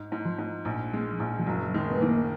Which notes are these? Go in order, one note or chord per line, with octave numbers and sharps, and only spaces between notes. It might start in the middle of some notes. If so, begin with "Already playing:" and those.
Already playing: G#2
G#2
F3
G#2
A#1
G#3
A#1
F3
F#1 F#3
D#3 G#3
B3
D#3 A#3